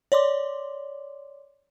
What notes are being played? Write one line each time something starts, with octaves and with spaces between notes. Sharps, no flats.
C#5 D5 C6 D6